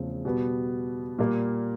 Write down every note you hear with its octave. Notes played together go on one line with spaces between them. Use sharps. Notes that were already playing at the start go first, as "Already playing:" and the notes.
Already playing: E2 C#3 F3 A3 C4
B2 G3 B3
A#2 G3 A#3